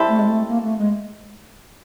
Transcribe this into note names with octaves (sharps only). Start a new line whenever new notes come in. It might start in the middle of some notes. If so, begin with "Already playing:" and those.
Already playing: G3 C4 E4 A4
A3
G#3
A3
A#3
A3
G#3